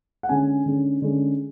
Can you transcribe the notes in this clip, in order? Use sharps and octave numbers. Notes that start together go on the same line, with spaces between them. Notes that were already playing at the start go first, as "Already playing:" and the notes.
F#5
D3 G#3 C#4 G#5
D3 G#3 C#4
D3 G#3 C#4